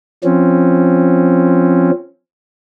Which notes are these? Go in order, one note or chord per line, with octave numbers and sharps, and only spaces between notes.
F3 C4 C#4